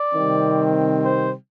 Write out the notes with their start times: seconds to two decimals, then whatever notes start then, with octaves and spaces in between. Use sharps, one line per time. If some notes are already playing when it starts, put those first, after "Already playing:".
Already playing: D5
0.14 C3 D#3 G3 C4
1.04 C5